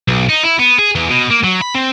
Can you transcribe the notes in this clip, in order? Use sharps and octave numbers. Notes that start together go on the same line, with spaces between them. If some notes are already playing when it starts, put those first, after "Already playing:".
B1
D#4
E4
B3
G#4
E2
B2
A#3
F#3
B5
C4